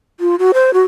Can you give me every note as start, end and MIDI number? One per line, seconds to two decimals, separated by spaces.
0.20 0.35 65
0.39 0.51 66
0.54 0.73 72
0.74 0.84 66